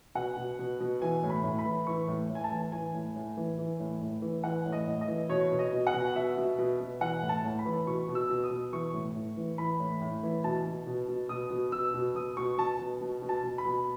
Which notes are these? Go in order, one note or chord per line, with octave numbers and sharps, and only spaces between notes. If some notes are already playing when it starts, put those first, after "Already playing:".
B2 F#5
B2
B2
B2
E3 G#5
A2
B5
A2
B5
E3
E3 C#6
A2
A2
G#5
A5
E3
E3 G#5
A2
A2
E3
E3
A2
A2
E3
E3 F#5
A2
D#5
A2
D#5
E3
B2 C#5
B2
D#5
B2
F#5
B2
B2 E5
B2
B2
B2
E3 F#5
A2
A5
A2
B5
E3
B2 C#6
B2
E6
B2
D#6
B2
E3 C#6
A2
A2
E3
E3 B5
A2
A2
E3
B2 A5
B2
B2
B2
B2 D#6
B2
B2 E6
B2
B2 D#6
B2 C#6
B2 A5
B2
B2
B2
A5
B2
B5
B2